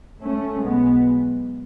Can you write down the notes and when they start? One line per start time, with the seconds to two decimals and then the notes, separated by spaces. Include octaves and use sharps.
0.21 A3 C#4
0.60 B1 B2 G#3 B3